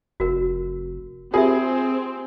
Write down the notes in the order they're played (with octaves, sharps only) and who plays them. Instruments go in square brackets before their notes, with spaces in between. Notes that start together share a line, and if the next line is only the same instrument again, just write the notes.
[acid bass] F1 [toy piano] F#4 A#4
[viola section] C4 [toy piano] F4 G4 E5 [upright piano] G#4 [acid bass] A#4